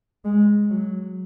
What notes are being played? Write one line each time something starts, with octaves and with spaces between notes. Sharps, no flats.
G#3
F#3